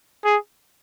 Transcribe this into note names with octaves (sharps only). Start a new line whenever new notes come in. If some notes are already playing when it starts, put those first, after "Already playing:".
G#4